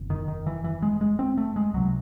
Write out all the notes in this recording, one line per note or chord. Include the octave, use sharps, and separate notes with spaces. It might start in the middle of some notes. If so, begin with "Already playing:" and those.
Already playing: F#1 E2 C3
D#3
D#3
E3
E3
G#3
G#3
C4
A3
G#3
C#2 C3 F#3